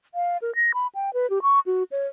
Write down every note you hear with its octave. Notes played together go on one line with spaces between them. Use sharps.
F5
A#4
A#6
B5
G5
B4
G4
C#6
F#4
C#5